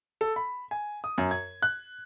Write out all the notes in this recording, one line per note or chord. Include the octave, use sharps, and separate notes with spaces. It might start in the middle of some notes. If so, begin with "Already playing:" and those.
A4
B5
G#5
D#6
F#2
G#6
F#6